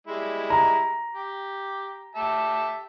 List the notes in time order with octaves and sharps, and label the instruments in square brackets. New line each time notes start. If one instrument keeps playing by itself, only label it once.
[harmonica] G3 G#3 E4
[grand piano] A#5
[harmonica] G4
G4 E5 A5